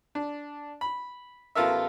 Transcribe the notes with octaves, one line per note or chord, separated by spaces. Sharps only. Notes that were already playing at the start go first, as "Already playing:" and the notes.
D4
B5
A1 B3 F4 A4 A#4 E5